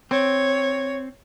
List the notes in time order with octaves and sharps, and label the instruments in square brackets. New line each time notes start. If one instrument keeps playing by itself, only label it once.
[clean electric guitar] C4 [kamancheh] C#5